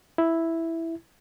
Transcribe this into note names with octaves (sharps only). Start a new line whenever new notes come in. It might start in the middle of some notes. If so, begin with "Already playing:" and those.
E4